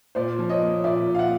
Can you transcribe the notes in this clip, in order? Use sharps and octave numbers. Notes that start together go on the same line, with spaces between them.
A#2 C5 D5
F3
C#5 D#5
A#3
A#2 D5 E5
A#2
F5
E5 F#5